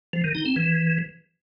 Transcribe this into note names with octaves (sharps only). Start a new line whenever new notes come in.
F3
D#3
D#4
C4
E3